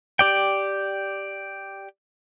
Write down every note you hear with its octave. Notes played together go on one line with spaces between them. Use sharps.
G4 D5 G5